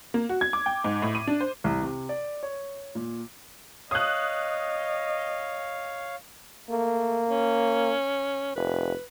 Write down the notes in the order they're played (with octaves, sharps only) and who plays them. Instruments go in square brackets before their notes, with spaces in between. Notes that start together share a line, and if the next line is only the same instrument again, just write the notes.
[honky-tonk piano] A#3
F#4
G#6
D6
G5
G#2
A2
D#7
D4
C5
[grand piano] C2
C3
D5
C#5
A#2
[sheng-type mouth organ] C#5 F5 [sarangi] D#5 [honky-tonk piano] D#6 F#6
[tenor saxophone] A3 [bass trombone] A#3
[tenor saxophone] C#4
[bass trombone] F1 [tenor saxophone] B4